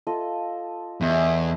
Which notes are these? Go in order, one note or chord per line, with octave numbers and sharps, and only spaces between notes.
F4 A4 D#5
E2 D#5 E5